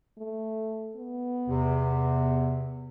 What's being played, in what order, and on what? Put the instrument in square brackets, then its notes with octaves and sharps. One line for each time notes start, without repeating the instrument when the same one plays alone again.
[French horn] A3
B3
[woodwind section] E2 C3